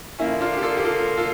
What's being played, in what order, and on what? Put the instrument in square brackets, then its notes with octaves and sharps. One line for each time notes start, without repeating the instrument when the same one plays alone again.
[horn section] D3 F3 A#3 [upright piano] C#4 E4
[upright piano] D4 F4
G4
F4 A4
G4
F4 A4
F4 A4